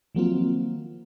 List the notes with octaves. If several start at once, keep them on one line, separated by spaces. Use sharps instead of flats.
D#3 F3 F#3 A#3 C4 F4